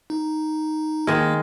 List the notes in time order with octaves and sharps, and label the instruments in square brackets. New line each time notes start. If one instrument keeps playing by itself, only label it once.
[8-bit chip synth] D#4
[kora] D#3 G#3 [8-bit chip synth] A#3